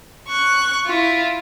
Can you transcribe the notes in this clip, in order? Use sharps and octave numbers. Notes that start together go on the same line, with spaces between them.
C#6 F#6
E4 F4